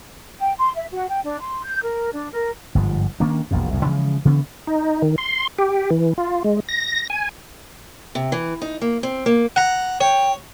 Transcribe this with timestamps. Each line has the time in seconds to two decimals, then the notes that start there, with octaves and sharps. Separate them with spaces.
0.39 G5
0.58 C6
0.75 E5
0.92 F#4
1.10 G5
1.23 D4
1.40 C6
1.63 G6
1.83 A#4
2.13 D4
2.33 A#4
2.75 G1 G#2 F3
3.20 D#3 A#3 C#4 D4
3.51 E1 A#1 F2 A#2
3.71 C2 F2 A2
3.86 C#3 E3 F3 G#3
4.25 C#3 E3 B3 C#4
4.67 D#4
5.02 D#3
5.18 C6
5.59 G4
5.90 E3
6.18 F4
6.44 G#3
6.69 A#6
7.10 G#5
8.15 C3
8.32 E3
8.62 D#4
8.81 A#3
9.03 C4
9.26 A#3
9.56 F#5 A#5
10.01 C#5 G5